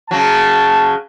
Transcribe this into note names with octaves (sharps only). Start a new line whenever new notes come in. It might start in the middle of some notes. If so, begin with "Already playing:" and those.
C#3 F#3 A5